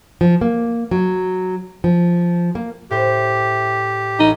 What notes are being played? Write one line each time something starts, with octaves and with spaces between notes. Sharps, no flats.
F3
A#3
F#3
F3
A#3
A2 G4 C5
A1 D#4